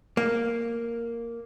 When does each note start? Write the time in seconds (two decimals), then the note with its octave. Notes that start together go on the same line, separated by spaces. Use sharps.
0.17 A#3